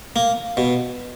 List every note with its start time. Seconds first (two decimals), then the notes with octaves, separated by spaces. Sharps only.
0.16 A#3
0.57 B2